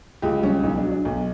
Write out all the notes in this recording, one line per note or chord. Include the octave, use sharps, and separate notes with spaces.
C#2 G4
G3 C#4
B1 D#4
D4
F#3
D4
B1